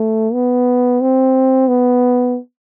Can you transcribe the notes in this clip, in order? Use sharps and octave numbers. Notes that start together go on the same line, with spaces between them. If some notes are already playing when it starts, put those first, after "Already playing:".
Already playing: A3
B3
C4
B3